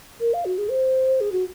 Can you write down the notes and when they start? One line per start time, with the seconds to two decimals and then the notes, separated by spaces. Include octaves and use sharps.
0.20 A#4
0.33 F5
0.45 F#4
0.58 G#4
0.70 C5
1.20 G#4
1.32 F#4